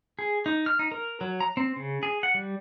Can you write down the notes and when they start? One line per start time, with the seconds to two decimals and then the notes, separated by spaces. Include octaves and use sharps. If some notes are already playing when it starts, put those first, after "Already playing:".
0.19 G#4
0.46 D#4
0.66 F6
0.79 D#4
0.92 A#4
1.21 F#3
1.40 A#5
1.57 C4
1.76 C#3
2.03 G#4
2.23 F#5
2.35 G3